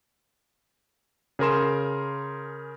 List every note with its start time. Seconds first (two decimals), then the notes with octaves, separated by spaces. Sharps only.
1.39 C#3 G#4 A#4 C6 E7